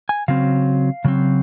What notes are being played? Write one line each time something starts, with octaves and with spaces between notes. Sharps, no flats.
G#5
C#3 F#3 C4 F5
C#3 F#3 C4